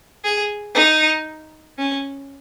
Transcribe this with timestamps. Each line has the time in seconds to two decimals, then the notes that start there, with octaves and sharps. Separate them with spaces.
0.24 G#4
0.75 D#4
1.78 C#4